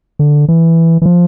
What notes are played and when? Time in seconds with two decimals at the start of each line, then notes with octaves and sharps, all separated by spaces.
0.19 D3
0.49 E3
1.02 E3
1.06 F3